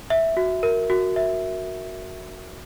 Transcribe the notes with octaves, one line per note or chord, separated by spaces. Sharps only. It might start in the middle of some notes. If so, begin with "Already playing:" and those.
E5
F#4
A#4
F#4
E5